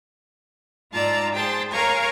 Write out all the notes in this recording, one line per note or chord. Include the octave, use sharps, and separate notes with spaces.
G#2 F4 D5 A5 A#5 E6
G#4 C5 G5 A5 C6
A#4 C#5 F5 G#5 A#5 C#6